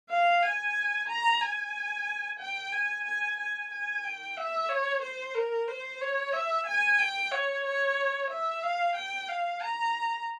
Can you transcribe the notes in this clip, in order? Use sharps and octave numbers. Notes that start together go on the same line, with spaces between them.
F5
G#5
A#5
G#5
G5
G#5
G#5
G#5
G#5
G5
E5
C#5
C5
A#4
C5
C#5
E5
G#5
G5
C#5
C#5
E5
F5
G5
F5
A#5